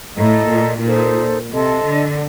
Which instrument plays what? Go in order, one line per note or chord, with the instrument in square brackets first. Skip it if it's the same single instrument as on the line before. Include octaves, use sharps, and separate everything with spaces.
[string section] A2 [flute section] A4 D#5 A#5
[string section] A#2
[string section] A#2 [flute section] D#4 A4 C5
[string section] C3 [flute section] A4 D#5 A5 C6
[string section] D3